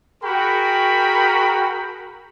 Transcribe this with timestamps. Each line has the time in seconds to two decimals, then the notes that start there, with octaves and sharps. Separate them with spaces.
0.24 F#4 G#4 A#4 G5 B5 C#6